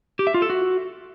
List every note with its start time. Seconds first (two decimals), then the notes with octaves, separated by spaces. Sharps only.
0.19 G4
0.27 E5
0.34 F4
0.42 A4
0.50 F#4